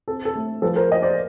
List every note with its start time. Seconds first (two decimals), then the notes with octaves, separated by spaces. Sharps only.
0.08 C4 A4
0.25 A4
0.35 A3
0.62 F3 A4 B4
0.76 A#4 C5
0.90 A#3 D#5
1.02 C5 D5